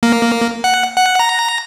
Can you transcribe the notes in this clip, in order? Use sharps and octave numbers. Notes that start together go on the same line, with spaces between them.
A#3
F#5
F#5
A#5